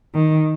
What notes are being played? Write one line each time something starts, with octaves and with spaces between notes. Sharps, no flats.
D#3